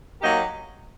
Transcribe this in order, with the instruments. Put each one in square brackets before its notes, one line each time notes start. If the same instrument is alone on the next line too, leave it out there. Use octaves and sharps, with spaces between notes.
[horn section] F#3 A#3 D#4 G4 A#4